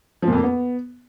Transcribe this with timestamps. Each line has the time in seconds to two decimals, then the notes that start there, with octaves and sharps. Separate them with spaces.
0.22 F3
0.28 A#2
0.33 F2
0.38 A#3
0.43 B3